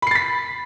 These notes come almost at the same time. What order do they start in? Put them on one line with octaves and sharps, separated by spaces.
B5 C7 A6 B6